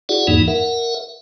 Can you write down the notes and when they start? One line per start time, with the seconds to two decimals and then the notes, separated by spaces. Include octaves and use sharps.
0.09 E4 F#4 G#4 D5 F#5
0.27 E2 G#2 E3 A#3 D#4
0.48 A#4 E5 F#5